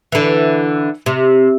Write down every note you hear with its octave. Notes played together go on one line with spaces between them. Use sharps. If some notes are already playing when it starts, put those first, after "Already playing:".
D3 E3
C3